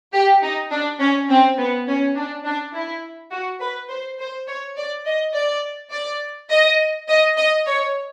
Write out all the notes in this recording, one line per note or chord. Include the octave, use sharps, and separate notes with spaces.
G4
D#4
D4
C#4
C4
B3
C#4
D4
D4
E4
F#4
B4
C5
C5
C#5
D5
D#5
D5
D5
D#5
D#5
D#5
C#5